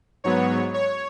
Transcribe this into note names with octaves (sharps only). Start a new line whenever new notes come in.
G#2 F#3 B3 C#5
C#5